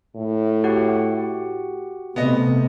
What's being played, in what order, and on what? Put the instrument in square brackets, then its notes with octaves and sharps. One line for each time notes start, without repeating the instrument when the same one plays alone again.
[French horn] A2
[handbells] F#4 G4 F#5
[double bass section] C3 [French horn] A3 [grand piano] B3 D#5